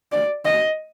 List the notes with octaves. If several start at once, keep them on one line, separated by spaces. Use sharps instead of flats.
D5
D#5